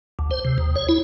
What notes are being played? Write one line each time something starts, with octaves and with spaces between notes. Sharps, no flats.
D2
C5
C3
D#2
C#5
E4